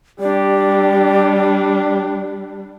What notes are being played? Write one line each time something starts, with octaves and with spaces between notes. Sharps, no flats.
G3 D4 G4 D5